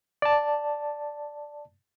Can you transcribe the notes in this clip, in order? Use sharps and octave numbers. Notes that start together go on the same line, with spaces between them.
D5 A5